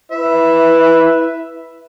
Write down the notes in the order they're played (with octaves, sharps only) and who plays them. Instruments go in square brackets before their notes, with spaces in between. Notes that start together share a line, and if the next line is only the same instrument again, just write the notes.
[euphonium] E4 [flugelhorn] B4 [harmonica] E5